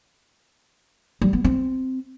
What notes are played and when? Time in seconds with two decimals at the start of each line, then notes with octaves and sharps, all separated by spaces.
1.22 G3
1.33 B3
1.44 C4